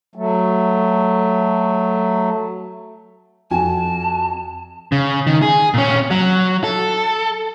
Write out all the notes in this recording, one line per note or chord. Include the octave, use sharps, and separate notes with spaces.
F#3 A3
F2 F#4 G#5 A5
C#3
D#3
G#4
A#2 C#4
F#3
A4